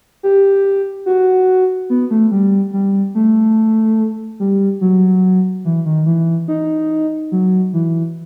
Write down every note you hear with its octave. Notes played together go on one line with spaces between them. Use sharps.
G4
F#4
B3
A3
G3
G3
A3
G3
F#3
E3
D#3
E3
D#4
F#3
E3